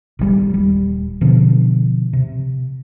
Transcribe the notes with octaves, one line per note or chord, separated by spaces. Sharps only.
G#1 C#3 G3
D#1 G3
B2 D3 F3
C3